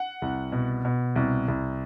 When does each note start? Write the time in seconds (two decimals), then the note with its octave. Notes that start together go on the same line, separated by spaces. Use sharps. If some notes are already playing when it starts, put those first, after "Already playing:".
Already playing: F#5
0.22 C2
0.52 B2
0.85 B2
1.16 C2
1.48 C2